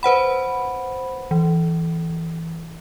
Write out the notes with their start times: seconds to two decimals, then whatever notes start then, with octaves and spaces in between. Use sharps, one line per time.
0.03 B4 C5 F#5 B5
1.31 E3